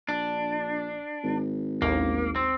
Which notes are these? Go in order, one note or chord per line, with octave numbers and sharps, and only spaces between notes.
A#1 D4
G#1
A1 D#2 A#3
C4